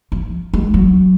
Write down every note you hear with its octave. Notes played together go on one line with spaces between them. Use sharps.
F3
G#3
F#3